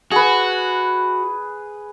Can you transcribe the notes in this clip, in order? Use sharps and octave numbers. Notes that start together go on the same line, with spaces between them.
F#4 G#4 B4